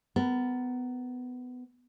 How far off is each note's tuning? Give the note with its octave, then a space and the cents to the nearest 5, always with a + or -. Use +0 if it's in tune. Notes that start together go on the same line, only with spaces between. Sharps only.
B3 +20 A#4 +0